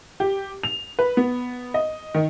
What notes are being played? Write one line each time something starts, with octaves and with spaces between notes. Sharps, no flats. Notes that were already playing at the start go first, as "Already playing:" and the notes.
G4
F7
B4
B3
D#5
D#3